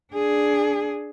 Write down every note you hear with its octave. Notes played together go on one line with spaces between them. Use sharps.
D4 G#4